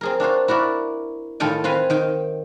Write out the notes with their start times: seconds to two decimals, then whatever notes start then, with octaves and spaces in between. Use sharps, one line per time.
0.01 C4 G#4 A#4
0.20 D4 F4 F#4 C5
0.48 E4 F#4 A#4 D5
1.40 A2 D#3 F4 A4 G5 G#5
1.64 C4 F4 B4 F5 G#5
1.90 D#3 G5